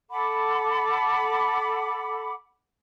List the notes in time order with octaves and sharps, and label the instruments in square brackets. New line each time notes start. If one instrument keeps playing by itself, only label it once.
[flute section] A4 F#5 B5 D6